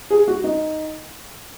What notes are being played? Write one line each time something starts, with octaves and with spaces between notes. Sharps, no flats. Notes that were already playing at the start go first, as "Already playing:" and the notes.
G#4
F#4
D#4